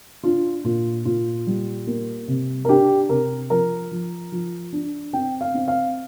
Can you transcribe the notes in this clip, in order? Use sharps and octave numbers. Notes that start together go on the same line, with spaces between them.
D4 F4
A#2 F4
A#2 F4
G3
A#3
C3
A#4
D4 G4
C3 A#4
F3 A#4
F3
F3
D4
C4 G5
F5
C4
F5